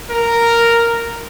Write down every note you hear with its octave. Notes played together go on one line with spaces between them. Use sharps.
A#4